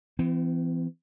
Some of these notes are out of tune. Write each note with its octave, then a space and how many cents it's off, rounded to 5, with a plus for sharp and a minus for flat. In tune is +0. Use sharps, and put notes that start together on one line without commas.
E3 +25 C4 -40